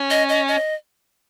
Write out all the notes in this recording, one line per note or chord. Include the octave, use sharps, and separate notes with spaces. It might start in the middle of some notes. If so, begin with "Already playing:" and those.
Already playing: C#4
D#5
D#5
D#5